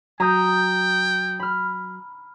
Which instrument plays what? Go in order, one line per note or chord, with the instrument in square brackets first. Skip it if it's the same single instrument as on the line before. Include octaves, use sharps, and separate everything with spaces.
[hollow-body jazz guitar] F#3 [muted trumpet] G5 [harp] A#5 D#6 G6
[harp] B5 F6